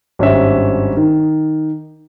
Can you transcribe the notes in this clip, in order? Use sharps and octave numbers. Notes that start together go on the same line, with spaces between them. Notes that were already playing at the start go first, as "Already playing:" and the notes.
G#1 G2 C#4 G4 E5
D#3